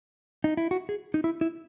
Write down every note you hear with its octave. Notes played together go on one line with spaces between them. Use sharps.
D#4
E4
F#4
G#4
D#4
E4
E4